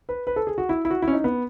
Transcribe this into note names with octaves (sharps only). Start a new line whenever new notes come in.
B4
B4
A4
G#4
F#4
E4
E4
F#4
E4
C#4
D#4
B3